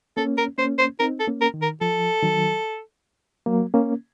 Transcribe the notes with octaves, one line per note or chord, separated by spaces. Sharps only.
A#3 C#4 A4
A#4
A#3 C#4 C5
C5
C4 D#4 A#4
A4
A#3 C#4
A#4
D#3
A#4
F3 A4
D#3 F#3
F#3 A#3
A#3 C#4